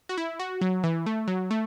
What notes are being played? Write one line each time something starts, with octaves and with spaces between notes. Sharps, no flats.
F#4
E4
F#4
F#3
E3
A3
F#3
A3